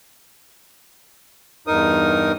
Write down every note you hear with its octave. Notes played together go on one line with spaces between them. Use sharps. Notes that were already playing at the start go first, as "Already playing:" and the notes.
E2 G2 D#4 A#4 D#6